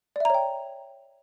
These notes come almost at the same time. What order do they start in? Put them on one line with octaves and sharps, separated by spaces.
D5 E5 A#5 C#5 G5